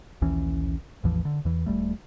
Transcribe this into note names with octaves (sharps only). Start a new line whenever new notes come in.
A#1 D#2 E3 C#4
A1 E2 E3 F3
D3
E2 E3
D#1 E2 G3 A3